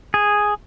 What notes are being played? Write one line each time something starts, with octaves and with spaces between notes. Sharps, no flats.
G#4